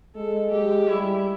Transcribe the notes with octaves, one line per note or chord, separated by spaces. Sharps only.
G#3 A4
G#3 G4
G3 E4